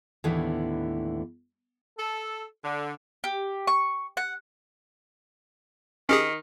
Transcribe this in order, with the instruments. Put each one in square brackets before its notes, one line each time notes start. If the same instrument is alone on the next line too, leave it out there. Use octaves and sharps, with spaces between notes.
[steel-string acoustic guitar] D#2 A2 D3 E3 B3
[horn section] A4
D3
[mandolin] G4
C#6
F#5
[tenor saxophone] D#3 [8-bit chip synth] C#4 G4 G#4